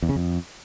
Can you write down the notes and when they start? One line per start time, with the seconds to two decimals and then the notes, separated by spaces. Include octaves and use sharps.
0.02 E2
0.09 C#3
0.16 F2